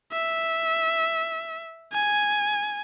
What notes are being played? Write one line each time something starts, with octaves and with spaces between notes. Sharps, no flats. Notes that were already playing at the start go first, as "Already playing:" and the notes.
E5
G#5